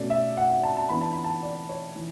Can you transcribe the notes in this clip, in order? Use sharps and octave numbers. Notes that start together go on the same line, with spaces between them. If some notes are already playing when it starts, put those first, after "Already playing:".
Already playing: B2 A3 C#4 D5
E5
F#5
F#5
A5
A5
E3 B3 D4 B5
A5
B5
A5
D5
C#5
E3